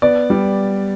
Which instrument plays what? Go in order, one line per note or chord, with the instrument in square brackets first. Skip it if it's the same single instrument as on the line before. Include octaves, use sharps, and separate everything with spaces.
[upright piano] B3 D5
G3